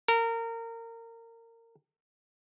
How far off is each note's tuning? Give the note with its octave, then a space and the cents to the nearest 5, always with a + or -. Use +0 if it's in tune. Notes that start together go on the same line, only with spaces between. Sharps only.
A#4 -25